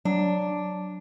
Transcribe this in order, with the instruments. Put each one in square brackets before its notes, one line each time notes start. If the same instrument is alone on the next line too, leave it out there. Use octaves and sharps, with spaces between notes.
[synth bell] F#3 [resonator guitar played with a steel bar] D4